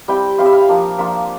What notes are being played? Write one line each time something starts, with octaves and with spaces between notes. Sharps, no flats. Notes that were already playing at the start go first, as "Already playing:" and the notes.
G3 C4 E4 G5
G3 C4 E4 F5
E5
F5
F3 A#3 D4 F4
F3 A#3 D4 F4 E5